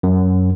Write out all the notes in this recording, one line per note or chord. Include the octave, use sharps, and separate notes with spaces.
F#2